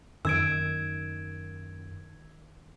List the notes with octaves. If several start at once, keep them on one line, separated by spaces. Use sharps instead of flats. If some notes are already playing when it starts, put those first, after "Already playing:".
F#2 D#3 E6 G#6 D7